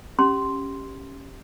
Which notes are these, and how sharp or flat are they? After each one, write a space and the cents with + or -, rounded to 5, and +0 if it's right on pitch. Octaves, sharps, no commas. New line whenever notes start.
C#4 -10 G4 +0 C6 +0